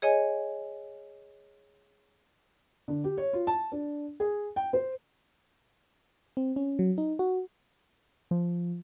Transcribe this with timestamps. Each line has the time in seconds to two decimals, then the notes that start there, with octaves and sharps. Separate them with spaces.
0.02 G#4 C#5 D#5 G#5
2.88 D3
3.04 G4
3.17 C#5
3.33 F4
3.47 A5
3.72 D4
4.20 G#4
4.56 G5
4.73 C5
6.37 C4
6.56 C#4
6.79 F#3
6.98 D#4
7.19 F#4
8.31 F3